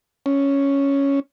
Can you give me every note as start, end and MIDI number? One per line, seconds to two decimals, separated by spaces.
0.26 1.20 61